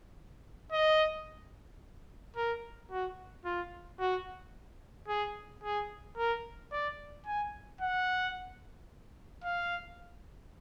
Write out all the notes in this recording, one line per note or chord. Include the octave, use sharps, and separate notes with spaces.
D#5
A#4
F#4
F4
F#4
G#4
G#4
A#4
D5
G#5
F#5
F5